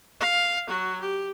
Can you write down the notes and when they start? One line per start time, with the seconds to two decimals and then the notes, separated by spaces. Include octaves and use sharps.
0.21 F5
0.68 F#3 F#4
1.01 G4